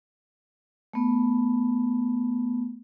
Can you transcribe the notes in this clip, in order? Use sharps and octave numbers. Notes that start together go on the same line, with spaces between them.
A3 B3